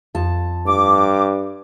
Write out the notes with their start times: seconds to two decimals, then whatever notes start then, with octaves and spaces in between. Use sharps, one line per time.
0.15 F2 A5
0.66 G2 D6